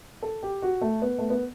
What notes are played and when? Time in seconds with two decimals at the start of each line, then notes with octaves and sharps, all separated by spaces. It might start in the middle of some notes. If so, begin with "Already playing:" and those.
0.22 A4
0.43 G4
0.62 F#4
0.81 A3
1.02 B3
1.19 A3
1.30 B3